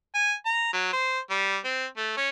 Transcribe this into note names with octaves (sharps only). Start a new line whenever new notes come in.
G#5
A#5
F#3
C5
G3
C4
A3
C#4